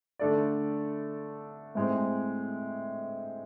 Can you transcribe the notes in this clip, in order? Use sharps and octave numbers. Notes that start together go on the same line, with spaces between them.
D3 A3 D4 A4 D5
A2 G#3 C4